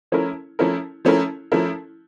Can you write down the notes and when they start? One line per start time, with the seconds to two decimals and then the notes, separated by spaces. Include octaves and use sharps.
0.12 F3 A3 C#4 E4 A#4
0.59 F3 A3 C#4 E4 A#4
1.05 F3 A3 C#4 E4 A#4
1.52 F3 A3 C#4 E4 A#4